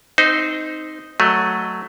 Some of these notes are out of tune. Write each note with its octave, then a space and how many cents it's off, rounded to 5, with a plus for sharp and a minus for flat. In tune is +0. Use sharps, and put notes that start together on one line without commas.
C4 +0 D#4 +0 C5 -25
F#3 +0 A3 +0 D#5 +0